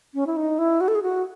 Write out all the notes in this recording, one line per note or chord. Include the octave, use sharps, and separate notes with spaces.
C#4
E4
D#4
E4
F#4
A4
G#4
F#4